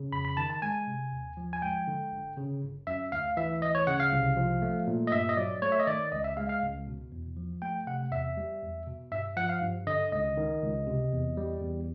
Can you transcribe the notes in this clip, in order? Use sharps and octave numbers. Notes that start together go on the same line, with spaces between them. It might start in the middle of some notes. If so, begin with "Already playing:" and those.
Already playing: C#3
F2 B5
B5
D#3 A5
A5
G#3 G#5
C3
D#2
F3
G#5
G#3 G5
D3
G1
C#3
G1
F#2 E5
D2 F5
E3 E5
D2 D#5
C#5
C#3 F#5
F5
C2
F3
A3
A#2
D#5
G2 E5
D#5
F#3 D5
A3 C#5
E5
D#5
D#3 D5
C#2 D#5
E5
G#3 F5
F5
C#2
B2
E2
F3
A3 G5
C3 F#5
E2 E5
G3
E2
B2
G2 E5
F3 F#5
F5
G2
D3 D#5
C#2 D#5
D#3
C#2
C3
E2
G3
E2